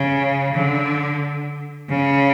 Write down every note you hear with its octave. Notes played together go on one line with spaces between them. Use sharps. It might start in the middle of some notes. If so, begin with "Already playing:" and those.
Already playing: C#3
D3
C#3